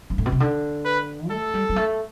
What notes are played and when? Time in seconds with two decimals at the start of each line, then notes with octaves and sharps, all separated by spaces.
0.10 G2
0.18 A2
0.26 B2
0.32 C3
0.40 D3
0.85 B4
1.30 A3 A4
1.54 G3
1.69 G3
1.76 A3